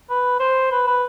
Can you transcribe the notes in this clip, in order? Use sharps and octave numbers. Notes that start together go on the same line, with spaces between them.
B4
C5
B4
B4